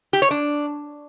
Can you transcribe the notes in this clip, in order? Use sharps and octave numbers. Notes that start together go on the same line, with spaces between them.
G4
C#5
D4